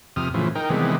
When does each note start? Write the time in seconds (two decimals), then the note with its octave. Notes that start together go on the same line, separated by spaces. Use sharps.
0.16 F2 C3 D#6 F6
0.34 A2 C#3 E3 F3
0.55 D#4 A#4 G5
0.70 C3 D#3 E3 G3 G#3 B3